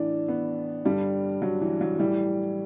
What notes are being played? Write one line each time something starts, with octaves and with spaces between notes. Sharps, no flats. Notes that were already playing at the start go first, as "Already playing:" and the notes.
Already playing: A2 E3 D4
B3
G2 D3 G3
F#3
E3
F#3
A2 E3 G3